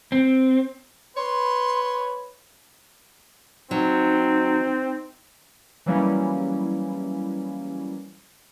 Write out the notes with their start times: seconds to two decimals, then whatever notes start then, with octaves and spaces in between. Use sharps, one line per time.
0.12 C4
1.17 B4 C#5 C6
3.71 F#3 C4 D#4
5.86 E3 F#3 G3 A#3 C#4 E4